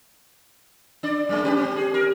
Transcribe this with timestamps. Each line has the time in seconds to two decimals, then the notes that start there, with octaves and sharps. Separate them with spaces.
1.03 D4 D5
1.29 F#2 G#3 A#3
1.44 C#4 G4 B4
1.57 C4 G4
1.76 G#4
1.94 A#4